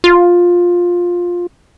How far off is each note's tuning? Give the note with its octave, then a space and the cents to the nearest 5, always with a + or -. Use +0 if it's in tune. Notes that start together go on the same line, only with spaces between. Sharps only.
F4 +10